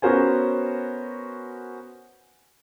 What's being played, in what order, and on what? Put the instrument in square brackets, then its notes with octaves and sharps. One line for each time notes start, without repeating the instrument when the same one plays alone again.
[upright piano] B3 C#4 F#4 A#4 C5 G#5